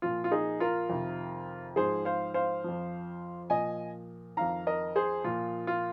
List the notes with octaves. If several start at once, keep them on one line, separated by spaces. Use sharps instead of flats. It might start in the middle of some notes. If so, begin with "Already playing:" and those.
A#2 F3 F4
F4
D#4 G#4
F4 A#4
F2 C3 D#3
G#2 F3 G#4 C5
C5 F5
C5 F5
F2 F3
A#2 F3 D#5 G#5
F2 D#3 F5 A#5
A#4 D#5
G#4 C5
A#2 F3 F4
F4